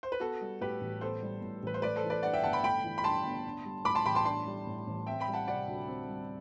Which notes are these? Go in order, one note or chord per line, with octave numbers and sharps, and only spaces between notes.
C5
B4
B3 F#4 A4
G3
A2 G4 B4
A1
B3 A4 C5
G3
A2
A1 B4
C5
A3 B4 D5
A4 C5
E3
B4 D5
G2 D5 F#5
E5 G5
G1 F#5 A5
G5 B5
A3 G5 B5
E3
B5
G2 A5 C6
G1
D4
G3
A2 B5 D6
A5 C6
A1 G5 B5
A5 C6
D4 A5 C6
G3
A2
A1
C4 E5 G5
G5 B5
G3
F#5 A5
C3 D5 F#5
D2
C4
G3